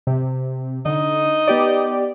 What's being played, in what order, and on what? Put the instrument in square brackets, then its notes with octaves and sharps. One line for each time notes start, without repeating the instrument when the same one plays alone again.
[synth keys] C3
[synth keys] D3 [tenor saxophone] D#4
[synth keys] B3 G4 D5